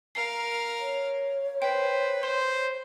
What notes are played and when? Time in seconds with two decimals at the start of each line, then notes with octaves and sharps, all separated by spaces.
0.15 A#4 F5 C7
0.80 C#5
1.62 B4 C5 G5
2.23 C5 C6